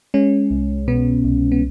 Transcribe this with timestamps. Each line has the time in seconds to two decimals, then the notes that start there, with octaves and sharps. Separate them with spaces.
0.14 G#3 C#4
0.51 C2
0.88 B2 B3
1.24 C2
1.52 B3